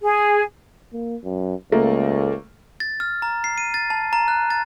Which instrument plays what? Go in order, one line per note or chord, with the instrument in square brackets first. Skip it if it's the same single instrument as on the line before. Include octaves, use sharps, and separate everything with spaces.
[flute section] G#4
[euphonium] A#3
F#2
[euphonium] C#2 [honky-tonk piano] A3 A#3
[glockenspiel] A6
F6
A#5
C7
D#7
A6
A5
A#5
F#6
A6